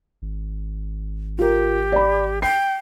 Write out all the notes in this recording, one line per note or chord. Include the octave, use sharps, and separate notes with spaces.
G#1
F4 G4 A#4
D5 B5
G5 C7